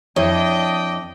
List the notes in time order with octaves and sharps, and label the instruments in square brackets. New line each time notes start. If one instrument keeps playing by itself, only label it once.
[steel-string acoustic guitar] F2 [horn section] D4 D#5 G5 [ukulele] E4 C#5